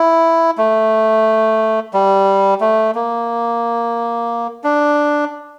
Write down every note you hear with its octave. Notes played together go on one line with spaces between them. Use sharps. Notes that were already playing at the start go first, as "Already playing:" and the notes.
Already playing: E4
A3
G3
A3
A#3
D4